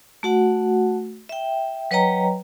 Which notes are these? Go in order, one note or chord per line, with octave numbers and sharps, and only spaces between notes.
A3 F#4 F#5
E5 G5
F#3 B4 C#5 D#5 G5 A#5